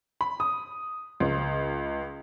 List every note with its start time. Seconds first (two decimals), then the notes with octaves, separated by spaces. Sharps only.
0.21 B5
0.40 D#6
1.20 C#2